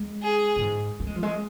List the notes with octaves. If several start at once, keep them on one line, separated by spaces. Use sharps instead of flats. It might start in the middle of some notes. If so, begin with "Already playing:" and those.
Already playing: G#3
G#4
A#2
G#2
A#3
G#3
F3
G#3